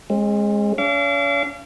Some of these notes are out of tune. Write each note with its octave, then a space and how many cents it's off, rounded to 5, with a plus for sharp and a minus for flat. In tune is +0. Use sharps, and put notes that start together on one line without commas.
G#3 -5 C#4 -45
C#4 +40 F5 -40 D6 -35